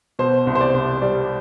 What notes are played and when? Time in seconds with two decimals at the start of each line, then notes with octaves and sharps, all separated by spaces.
0.19 B2 C5
0.47 C2
0.55 C5
0.61 D5
0.74 C2
1.02 G3 D5